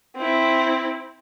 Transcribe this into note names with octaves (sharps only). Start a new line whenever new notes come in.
C4 E4